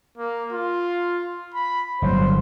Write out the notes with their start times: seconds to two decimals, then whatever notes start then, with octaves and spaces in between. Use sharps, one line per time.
0.18 A#3
0.53 F4
1.54 B5
2.02 G1 F#3 C5